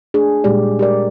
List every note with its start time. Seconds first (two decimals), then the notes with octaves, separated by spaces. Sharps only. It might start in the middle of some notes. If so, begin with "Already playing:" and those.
0.14 A3 D4 G#4
0.44 A#2 G3 G#3 G4 D5
0.79 G4 A#4 D5